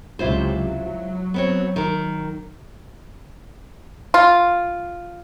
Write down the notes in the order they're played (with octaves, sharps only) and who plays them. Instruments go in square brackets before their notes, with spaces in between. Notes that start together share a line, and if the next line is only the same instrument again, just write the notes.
[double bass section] C#2 C3 F#3 [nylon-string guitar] E4 F4 C5
[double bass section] F#3
[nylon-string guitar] B3 C4 C#5
D#3 A#4
[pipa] F4